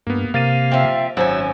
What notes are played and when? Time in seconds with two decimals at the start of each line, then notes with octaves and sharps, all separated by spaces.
0.07 G2 A#3 B3
0.34 C3 A#3 F5 A6 D#7
0.72 F3 C4 E5
1.17 G#1 F#2 F#3 C#4 C5 G#5 E6